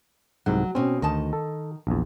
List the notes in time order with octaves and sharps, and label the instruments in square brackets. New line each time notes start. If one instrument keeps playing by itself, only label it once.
[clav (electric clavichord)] C2 G#2 F#5 [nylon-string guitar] F#3
[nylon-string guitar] B2 C#4 [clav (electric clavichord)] C4
[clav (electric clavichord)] D2 [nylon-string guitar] D#3 D#5 A5
[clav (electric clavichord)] A4
A#1 E2